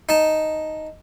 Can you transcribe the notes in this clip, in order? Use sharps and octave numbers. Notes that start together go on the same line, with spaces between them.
D#4 A5